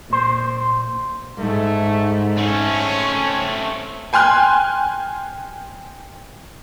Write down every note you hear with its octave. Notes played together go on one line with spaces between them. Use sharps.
A#2 C5
G#2 A3
A3 C4 C#4
G5 G#5 C6 F6 F#6